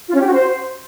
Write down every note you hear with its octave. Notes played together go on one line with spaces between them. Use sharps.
F4
C#4
G4
F#4
C5